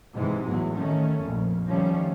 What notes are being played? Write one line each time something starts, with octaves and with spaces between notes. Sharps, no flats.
G#2 C3 E3 G#3
A1 E2 F#3
D#3 A3 C#4
A#1 F2
D#3 F3 G3 A3 C#4